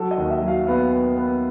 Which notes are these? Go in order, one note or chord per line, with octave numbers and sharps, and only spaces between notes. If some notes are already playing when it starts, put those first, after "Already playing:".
Already playing: F#3 A4
D#5
D#2
E5
F#3
F5
B3 F5
B3
B3